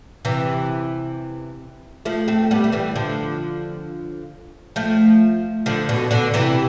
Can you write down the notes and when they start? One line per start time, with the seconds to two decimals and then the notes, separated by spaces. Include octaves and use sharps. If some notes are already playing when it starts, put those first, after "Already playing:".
0.25 C3 E3
2.05 F3 A3
2.28 A3 C4
2.51 G3 B3
2.64 A3
2.72 E3 G3
2.95 D3 F3
4.76 F3 A3
5.66 D3 F3
5.89 B2 D3
6.11 B2 D3
6.34 C3 E3